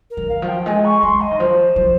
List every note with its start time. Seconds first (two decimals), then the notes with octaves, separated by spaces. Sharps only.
0.11 A#4
0.17 D#3
0.29 F5
0.42 F3
0.48 G5
0.66 G#3 G#5
0.85 C#6
1.03 G#3 C6
1.21 D#5
1.31 D#3
1.40 F3 C5
1.76 F3